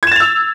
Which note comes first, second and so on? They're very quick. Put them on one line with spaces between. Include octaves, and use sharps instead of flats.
G#6 E7 A6 F7 E6